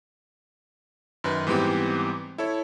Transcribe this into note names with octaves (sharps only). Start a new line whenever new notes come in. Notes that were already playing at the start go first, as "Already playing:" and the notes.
F#2 D#3 B4
G#2 E3 G3 B3 C4 G4
E4 A4 C#5